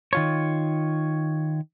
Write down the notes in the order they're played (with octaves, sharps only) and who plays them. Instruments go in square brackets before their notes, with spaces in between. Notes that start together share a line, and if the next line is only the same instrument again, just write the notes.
[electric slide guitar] D#3 F4 C#5